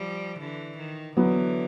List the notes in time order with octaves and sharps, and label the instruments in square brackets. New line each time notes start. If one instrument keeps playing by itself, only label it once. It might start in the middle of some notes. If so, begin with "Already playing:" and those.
Already playing: [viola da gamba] F3 G3
D3 E3
D#3
[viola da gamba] D3 E3 [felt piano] F#3 B3 E4